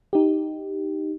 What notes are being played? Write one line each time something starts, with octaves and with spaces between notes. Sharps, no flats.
D#4 G4